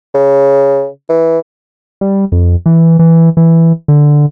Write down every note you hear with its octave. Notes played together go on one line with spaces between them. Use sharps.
C#3
E3
G3
F2
E3
E3
E3
D3